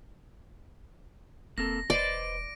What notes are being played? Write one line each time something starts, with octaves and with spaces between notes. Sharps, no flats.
E1 A#3 C4 A4 A#6
E1 B4 C5 D5 D#5 D7